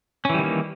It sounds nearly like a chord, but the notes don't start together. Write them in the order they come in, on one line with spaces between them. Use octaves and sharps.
C#4 E3 G3 D#3 A#3